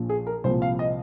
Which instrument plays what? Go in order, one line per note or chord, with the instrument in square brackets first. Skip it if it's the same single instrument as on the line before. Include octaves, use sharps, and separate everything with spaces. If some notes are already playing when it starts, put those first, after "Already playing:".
Already playing: [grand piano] A#1 A#2 F3
G#4
A#4
C2 A#2 F3 C5
F5
D#5